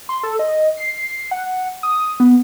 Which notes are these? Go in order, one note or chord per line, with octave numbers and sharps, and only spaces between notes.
C6
A4
D#5
C7
F#5
D#6
B3